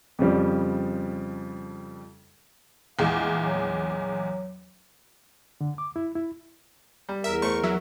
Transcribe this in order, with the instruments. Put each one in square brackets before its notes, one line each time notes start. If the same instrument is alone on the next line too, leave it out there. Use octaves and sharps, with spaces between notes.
[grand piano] F2 C#3 F3 G3
[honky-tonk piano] A#1 E2 G#3 [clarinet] F5
[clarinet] F#3
[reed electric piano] D3
D6
E4
E4
[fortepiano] G3
[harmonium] E2 A#4 [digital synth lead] E5
[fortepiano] A3 C5 [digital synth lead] C#6
[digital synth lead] F#3 [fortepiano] E5